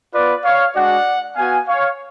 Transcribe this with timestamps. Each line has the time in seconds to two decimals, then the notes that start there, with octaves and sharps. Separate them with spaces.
0.13 B3 F4 B4 D5
0.43 C#5 F5
0.75 G#3 D4 F#4 D5 F#5
1.36 B3 F#4 F5 G#5
1.67 C#5 F5